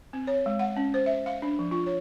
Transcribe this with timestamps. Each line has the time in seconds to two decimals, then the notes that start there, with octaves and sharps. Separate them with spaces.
0.13 C4
0.27 C#5
0.46 G#3
0.59 F#5
0.76 C#4
0.94 C5
1.06 E5
1.26 F5
1.42 D4
1.59 F3
1.71 F4
1.86 C#5